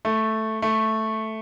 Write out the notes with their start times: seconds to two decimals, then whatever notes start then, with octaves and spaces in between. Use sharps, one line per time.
0.05 A3
0.62 A3